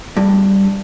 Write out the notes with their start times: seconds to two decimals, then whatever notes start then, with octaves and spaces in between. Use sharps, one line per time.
0.17 G2